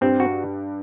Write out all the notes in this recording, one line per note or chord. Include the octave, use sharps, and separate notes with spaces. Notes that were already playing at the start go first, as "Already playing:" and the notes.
G2 G3 C4
F#4